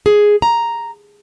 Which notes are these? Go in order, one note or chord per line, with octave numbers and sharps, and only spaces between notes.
G#4
A#5